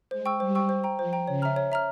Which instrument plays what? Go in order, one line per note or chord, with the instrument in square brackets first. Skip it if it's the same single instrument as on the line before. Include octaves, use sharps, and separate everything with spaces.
[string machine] G#3 [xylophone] C5
[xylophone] G5 C#6 E6
[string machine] G3 [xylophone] C5
[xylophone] G5 C#6 E6
C5
G5 A#5
[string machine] F3 [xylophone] C5
[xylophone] G5 A#5
[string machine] C#3 [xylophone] C#5
[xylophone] E5 A#5 F6
C#5
E5 A#5 F6